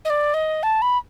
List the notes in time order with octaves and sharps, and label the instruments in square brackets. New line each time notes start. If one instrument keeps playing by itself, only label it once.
[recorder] D#5
D5
D#5
A5
B5